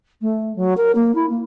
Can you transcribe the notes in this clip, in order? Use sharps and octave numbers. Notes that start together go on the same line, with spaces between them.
A3
F#3
A#4
A#3
E4
A#3